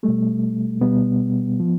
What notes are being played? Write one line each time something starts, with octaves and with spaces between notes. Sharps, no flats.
B2 G3 A3
B2 G3 B3
F3